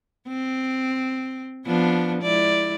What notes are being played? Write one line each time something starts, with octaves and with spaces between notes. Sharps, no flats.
C4
F3 B3 D4
G#3 E4 D5